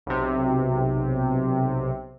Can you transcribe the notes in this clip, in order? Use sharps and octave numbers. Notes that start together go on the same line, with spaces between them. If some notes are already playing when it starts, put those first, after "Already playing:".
B1 C3